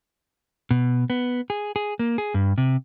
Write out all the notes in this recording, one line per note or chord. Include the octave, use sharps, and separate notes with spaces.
B2
B3
G#4
G#4
A#3
G#4
G2
C3